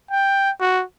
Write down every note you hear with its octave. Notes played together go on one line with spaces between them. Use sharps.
G5
F#4